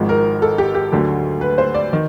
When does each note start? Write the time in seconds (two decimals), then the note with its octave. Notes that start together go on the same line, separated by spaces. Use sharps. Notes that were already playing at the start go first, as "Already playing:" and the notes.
Already playing: G#1 G#2 F3
0.09 A#4
0.42 A4
0.58 G4
0.75 G4
0.92 D2 D3 F#3
1.41 B4
1.58 C5
1.74 D5
1.93 D#3